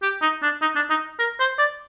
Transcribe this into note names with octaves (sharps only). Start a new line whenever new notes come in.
G4
D#4
D4
D#4
D4
D#4
A#4
C5
D5